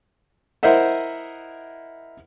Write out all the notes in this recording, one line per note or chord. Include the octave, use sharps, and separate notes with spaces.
E4 A#4 C5 D#5 E5 F#5